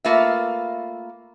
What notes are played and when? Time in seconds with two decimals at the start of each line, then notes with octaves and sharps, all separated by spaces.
0.04 A3 A#3 F4 B4 E5